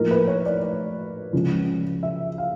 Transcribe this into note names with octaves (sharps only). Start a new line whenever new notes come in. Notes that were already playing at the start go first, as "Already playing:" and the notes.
Already playing: A2 F3 A#3 D#4 A#4
B4
C#5
D5
D5
C#2 C#3 F3
E5
F5